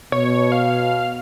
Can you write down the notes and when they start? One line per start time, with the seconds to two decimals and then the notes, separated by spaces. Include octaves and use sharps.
0.12 B2 C#5
0.52 F5